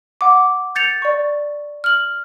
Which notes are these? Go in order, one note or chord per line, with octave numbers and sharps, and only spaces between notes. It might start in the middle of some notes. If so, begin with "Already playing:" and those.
F#5 D6
G6 A6 C#7 F7
D5 C#6
F6 F#7